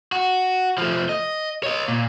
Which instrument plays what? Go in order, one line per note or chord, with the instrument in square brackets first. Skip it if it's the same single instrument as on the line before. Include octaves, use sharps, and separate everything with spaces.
[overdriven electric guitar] F#4
F3 A3
D#5
C#5 D#5
A#2